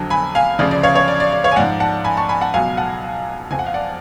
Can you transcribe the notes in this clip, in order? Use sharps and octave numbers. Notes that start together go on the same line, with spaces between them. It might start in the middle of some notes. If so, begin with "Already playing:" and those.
Already playing: F2 D3 F#3
G#5 B5
F5 G#5
D2 C#3 F3 D5
D5
C#5 F5
C#5
D5
D5
D5
C#5 F5
G#5
G#2 F3 D5 F#5
F#5 A5
G#5 B5
A5 C#6
G#5 B5
F#5 A5
C#2 B2 F#3 F5 G#5
F#5 A5
F2 F3 G#5
F#5
F5
D5 F#5